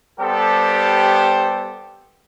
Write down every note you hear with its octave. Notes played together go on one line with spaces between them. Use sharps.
G3 B3 G4 A4 C5